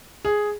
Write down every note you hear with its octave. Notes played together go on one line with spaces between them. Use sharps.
G#4